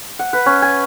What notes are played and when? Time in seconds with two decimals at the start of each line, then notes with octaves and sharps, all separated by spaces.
0.19 F#5
0.33 B4
0.46 C#4
0.62 G#5